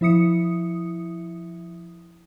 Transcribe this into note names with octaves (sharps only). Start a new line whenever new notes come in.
F3 E4 E5 D#6 C#7